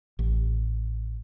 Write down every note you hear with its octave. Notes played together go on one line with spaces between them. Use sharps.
A1